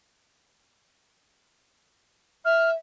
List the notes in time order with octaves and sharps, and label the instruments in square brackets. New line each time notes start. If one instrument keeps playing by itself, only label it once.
[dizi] E5 [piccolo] F6